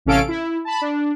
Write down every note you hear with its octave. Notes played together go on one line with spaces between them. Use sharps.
A1 C3 C#4 A4 F5 D7
E4
A5 B5
D4